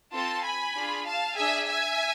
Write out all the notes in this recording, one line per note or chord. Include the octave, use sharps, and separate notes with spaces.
C4 F4 A4 A5 C6
G#5 B5
D4 F4 G#4
F5 A5
D4 G#4 E5 G#5
E5 G#5